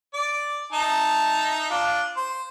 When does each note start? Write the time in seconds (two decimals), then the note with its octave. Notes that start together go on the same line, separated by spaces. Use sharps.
0.14 D5
0.72 D#4 E5 A5
1.70 D4 F4
2.17 C5